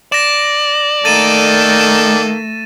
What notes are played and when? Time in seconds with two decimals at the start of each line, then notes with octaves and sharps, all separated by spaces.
0.12 D5 A#6 E7
1.05 D#3 A3 A#3 A4 A6 D#7 E7